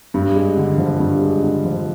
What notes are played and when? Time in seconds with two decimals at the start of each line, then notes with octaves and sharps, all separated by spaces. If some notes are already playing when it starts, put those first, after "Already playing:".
0.14 G2
0.35 G#3
0.57 D3
0.78 F3
1.00 G2
1.22 G#3
1.43 D3
1.65 F3